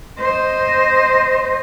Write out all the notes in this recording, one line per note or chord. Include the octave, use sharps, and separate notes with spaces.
C5 D#5